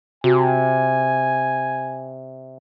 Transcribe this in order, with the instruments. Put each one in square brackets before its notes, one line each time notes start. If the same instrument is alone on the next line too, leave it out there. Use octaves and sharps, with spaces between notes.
[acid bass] C3 [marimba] F#4 [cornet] G#5